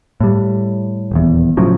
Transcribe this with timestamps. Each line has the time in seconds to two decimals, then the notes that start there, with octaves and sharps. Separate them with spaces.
0.21 A2 G3
1.12 D#1 E2
1.57 A2 C#3 F3 F#3